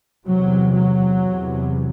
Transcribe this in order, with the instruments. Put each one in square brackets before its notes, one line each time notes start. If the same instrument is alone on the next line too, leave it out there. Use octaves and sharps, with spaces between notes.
[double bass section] E2 C3 F#3
F#3
E2 C3